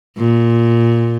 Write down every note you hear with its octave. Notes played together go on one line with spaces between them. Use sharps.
A#2